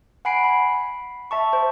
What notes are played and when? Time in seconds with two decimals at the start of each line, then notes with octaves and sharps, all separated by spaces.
0.25 F#5 G#5 B5 C7 D7
0.44 B5
1.31 E5 A5 C#6
1.53 C5